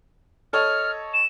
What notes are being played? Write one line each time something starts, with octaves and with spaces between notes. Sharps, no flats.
A4 C#5 D#5 F6
E7